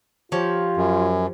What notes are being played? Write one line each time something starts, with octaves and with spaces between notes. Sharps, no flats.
F3 F4 G4 C#5
F#2